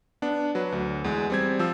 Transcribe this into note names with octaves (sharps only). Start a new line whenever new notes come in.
B3 D4
F#3 B4
D2
E2 G#3
G3 C4 G#6
F3 E6